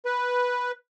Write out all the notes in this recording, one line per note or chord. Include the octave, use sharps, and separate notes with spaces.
B4